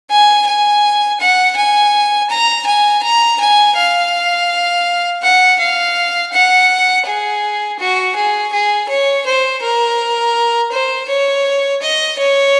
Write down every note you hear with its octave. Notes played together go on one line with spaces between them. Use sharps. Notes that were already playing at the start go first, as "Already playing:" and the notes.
G#5
G#5
F#5
G#5
A#5
G#5
A#5
G#5
F5
F#5
F5
F#5
G#4
F#4
G#4
G#4
C#5
C5
A#4
C5
C#5
D#5
C#5